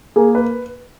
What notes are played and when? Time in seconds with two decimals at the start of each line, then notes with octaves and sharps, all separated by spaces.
0.16 A#3 G#4
0.35 B4